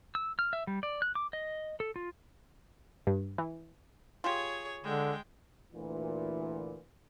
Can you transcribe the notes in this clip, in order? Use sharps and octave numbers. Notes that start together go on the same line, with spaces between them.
E6
F6
E5
G3
D5
F#6
D6
D#5
A4
F4
G2
E3
F4 G4 G#4 C#5
D3 G#3 G5
D2 A#2 E3